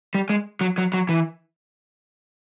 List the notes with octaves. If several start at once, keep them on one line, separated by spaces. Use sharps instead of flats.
G3
G#3
F#3
F#3
F#3
E3